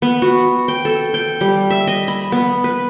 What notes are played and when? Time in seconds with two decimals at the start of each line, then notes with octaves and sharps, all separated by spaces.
0.02 B3
0.22 F#4
0.68 G5
0.85 A4
1.14 G5
1.41 G3
1.70 E5
1.87 D#5
2.08 B5
2.32 B3
2.64 B4